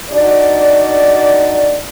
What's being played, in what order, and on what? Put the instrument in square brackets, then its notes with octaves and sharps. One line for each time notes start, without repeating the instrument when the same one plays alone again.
[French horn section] D4 D#4 F#4 D5